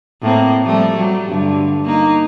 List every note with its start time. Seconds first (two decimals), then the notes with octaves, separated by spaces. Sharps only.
0.22 A2 A#3 C4
0.64 F3 G3 A3
0.95 F#3 G3
1.29 G2 D3
1.86 A#3 D#4